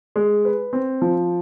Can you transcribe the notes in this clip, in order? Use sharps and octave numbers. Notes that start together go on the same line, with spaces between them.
G#3
B4
C4
F3